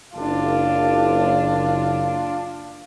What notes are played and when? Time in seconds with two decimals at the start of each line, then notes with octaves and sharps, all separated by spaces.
0.15 F#1 D4 F4